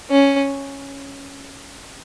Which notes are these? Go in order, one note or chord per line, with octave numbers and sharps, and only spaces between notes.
C#4